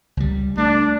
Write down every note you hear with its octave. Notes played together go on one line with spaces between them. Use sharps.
C#2 G3
A3 D4